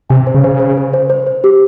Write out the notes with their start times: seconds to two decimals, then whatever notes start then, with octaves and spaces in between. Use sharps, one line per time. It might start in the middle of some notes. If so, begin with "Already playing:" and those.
0.10 C3 G#5
0.27 C5
0.35 C#3
0.44 C5
0.60 C5
0.77 C5
0.93 C5
1.10 C5
1.27 C5
1.44 G4